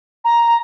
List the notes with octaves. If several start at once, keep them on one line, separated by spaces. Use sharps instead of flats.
A#5